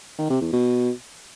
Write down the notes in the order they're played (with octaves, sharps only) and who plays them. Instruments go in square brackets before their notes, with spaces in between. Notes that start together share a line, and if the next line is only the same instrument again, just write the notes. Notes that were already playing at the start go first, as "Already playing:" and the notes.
[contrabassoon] D#3
C3
E2
B2